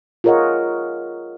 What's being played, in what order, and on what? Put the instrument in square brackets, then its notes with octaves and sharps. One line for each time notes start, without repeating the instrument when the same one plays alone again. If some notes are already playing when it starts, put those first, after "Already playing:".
[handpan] F4 G#4 A#4 C#5 D#5 F#5